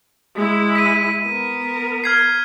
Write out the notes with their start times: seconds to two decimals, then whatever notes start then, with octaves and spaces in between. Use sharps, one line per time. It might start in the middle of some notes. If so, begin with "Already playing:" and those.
0.36 G#3 E4
0.75 B6 D#7
1.25 B3 A#4
2.04 F6 G#6 C7